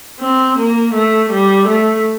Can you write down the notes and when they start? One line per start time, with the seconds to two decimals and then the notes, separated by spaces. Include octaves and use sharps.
0.21 C4
0.58 A#3
0.94 A3
1.31 G3
1.67 A3